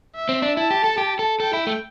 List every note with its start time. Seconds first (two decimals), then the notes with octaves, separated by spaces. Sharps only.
0.15 E5
0.29 C4
0.42 D4
0.57 E4 A5
0.71 G4
0.84 A4
0.98 G4
1.19 A4
1.40 A4 G5
1.53 E4
1.67 A3